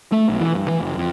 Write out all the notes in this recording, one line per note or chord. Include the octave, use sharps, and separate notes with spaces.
A3
B1
E3
G2
E3
F#1
F2